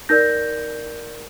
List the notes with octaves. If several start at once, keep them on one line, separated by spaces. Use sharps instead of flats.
D#4 A#4 D5 G6 A#6